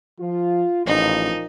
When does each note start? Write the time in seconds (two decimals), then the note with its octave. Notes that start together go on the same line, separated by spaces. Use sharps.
0.20 F3 F4
0.86 A1 A#2 F3 D#4